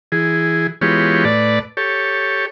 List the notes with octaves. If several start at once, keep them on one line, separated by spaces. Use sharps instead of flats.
E3 G#4
E3 G#3 B3 F4 G4 C#5
A2 B4 D5 A5
G4 A4 C#5